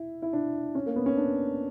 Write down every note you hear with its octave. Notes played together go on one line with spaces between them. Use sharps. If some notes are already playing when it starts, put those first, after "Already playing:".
Already playing: E4
E4
D4
C#4
A#3
B3
C#4
D4